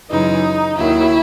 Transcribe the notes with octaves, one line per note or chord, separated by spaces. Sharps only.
F#2 C#3 E3 G#3 D#4
D#2 D#3 F#3 E4